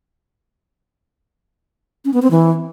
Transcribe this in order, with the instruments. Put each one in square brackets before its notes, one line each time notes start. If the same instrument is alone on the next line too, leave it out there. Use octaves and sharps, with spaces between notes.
[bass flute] C#4
B3
C4
E3